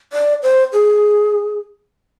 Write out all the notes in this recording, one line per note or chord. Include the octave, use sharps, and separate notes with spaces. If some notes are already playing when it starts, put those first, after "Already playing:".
D5
C5
G#4